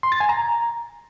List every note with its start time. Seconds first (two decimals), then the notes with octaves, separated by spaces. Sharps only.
0.03 C6
0.12 A6
0.20 G#5
0.29 A#5